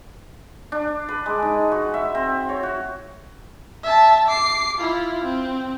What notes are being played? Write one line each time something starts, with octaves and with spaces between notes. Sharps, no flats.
D4
B4
G#3
D#4
F#4
E5
C4
C#5
F#4
E5 A5
D6 C7
E4 F4
C4